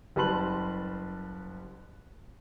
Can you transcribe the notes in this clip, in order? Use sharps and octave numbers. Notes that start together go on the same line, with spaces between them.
F#1 G3 B4 A5 C6 F#7